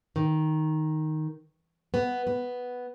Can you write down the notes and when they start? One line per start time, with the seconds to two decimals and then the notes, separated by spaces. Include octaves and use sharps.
0.16 D#3
1.94 B3
2.27 B3